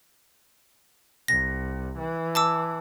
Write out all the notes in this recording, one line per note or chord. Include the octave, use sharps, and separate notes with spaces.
C2 A#6
E3
A5 D6 E6